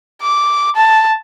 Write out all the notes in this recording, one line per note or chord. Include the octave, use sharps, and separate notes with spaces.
D6
A5